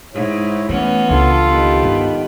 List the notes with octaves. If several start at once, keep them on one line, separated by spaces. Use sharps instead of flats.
G#2 E4 C#5
E3 A3 B3 C#4
C#2 D4 F4 A4
D#3 B3 G4
G1 G#2